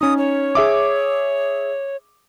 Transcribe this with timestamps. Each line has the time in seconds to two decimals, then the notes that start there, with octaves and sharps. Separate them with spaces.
0.01 C#4 D#4 D#6
0.17 C#5
0.55 G#4 E5 D6